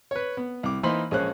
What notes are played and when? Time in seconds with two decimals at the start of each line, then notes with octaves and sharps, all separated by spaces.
0.11 B4 C#5
0.37 B3
0.63 C2 D6
0.83 E3 A#3 D#4 C5 B5 C6
1.11 A#1 G#3 C#4 C5 F#6